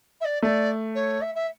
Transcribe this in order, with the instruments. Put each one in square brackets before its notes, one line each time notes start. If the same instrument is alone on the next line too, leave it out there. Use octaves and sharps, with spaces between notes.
[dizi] E5
D5
[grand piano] A3 [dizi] D5
[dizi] C#5
E5
E5